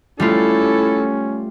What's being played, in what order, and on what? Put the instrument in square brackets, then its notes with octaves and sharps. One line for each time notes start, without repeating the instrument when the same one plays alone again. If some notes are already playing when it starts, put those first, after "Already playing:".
[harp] G3 A3 F4 [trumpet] C#4 [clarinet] E4 [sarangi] A4